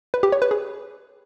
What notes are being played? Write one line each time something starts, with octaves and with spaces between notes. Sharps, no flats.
B4
G4
C#5
B4
G#4